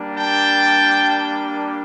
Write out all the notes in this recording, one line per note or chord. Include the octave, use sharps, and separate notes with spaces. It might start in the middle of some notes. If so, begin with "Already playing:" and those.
Already playing: G3 A#3 D4
G5 A5